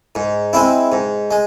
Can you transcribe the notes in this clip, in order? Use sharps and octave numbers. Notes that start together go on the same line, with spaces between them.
G#2
G#3 C4 E4
G#2
G#3